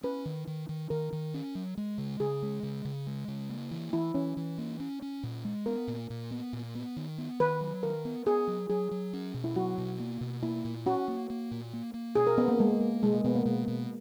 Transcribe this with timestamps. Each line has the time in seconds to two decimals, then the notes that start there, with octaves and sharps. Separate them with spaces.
0.03 C#4 B4
0.25 D#3
0.47 D#3
0.69 D#3
0.90 D#3 A#4
1.13 D#3
1.34 C#4
1.55 F#3
1.77 G#3
1.98 C#3
2.20 C#3 G#4
2.42 G#3
2.63 C#3
2.85 C#3
3.07 G#3
3.28 C#3
3.50 A#3
3.71 E3
3.93 E3 E4
4.14 E3 C#4
4.37 E3
4.58 A#3
4.80 C#4
5.02 C#4
5.23 A#2
5.45 G#3
5.66 B3 A#4
5.88 A#2
6.10 A#2
6.31 B3
6.53 A#2
6.75 B3
6.96 D#3
7.18 B3
7.40 D#3 B4
7.61 F#3
7.83 D#3 A#4
8.05 B3
8.26 B3 G#4
8.47 F#3
8.70 F#3 G#4
8.91 F#3
9.13 C#4
9.34 B2
9.44 E4
9.56 F#3 F#4
9.78 B2
10.00 A#3
10.21 B2
10.43 A#3 E4
10.65 A#2
10.86 C#4 F#4
11.08 A#3
11.30 A#3
11.51 A#2
11.73 A#3
11.94 A#3
12.15 B2 G#4
12.27 A#4
12.37 B3 C#4
12.48 A#3
12.59 G#3 A#3
12.80 A#3
13.03 B2 G#3
13.13 A#3
13.24 B2 B3
13.35 A#3
13.45 B2 G#3
13.68 B2